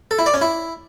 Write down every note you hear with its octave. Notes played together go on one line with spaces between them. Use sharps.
A4
E4
D5
C#4
E4